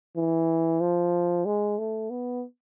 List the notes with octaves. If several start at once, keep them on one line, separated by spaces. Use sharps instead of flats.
E3
F3
G#3
A3
B3